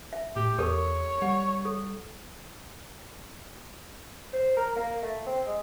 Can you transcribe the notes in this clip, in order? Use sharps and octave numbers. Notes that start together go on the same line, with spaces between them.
E5
A2 G4
E2 G4 A4 A#4 C#5
G3 F#5
A4
C5
A#4
A#3
A3
C4
G#3